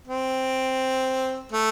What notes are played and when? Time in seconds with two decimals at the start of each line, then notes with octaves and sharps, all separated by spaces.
0.07 C4
1.52 A3